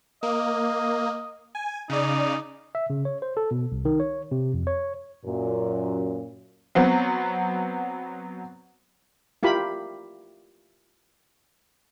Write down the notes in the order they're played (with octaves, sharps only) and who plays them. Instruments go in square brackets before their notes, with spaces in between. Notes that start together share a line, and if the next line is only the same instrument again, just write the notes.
[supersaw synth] A#3 [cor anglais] D#5
[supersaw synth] G#5
[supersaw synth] C#3 D5 [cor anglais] D#4
[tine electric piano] E5
C#3
C#5
C5
A4
B2
C2
D#3
C#5
C3
F2
C#5
[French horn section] F#2 A#2
[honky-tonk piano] F#3 B3 C4
[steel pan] E4 F4 G4 A#4 B5